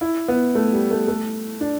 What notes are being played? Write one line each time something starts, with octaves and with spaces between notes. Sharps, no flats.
E4
B3
A3
G3
A3
A3
D4